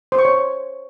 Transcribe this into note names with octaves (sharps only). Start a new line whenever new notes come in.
C5
C#6
C#5